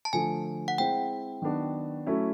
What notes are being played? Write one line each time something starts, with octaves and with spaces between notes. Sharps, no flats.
A5
D3 F3 A3 G#5
F#5
G#3 C4 E4 G5
D#3 F#3 B3 D4 F#4
F#3 A3 C#4 E4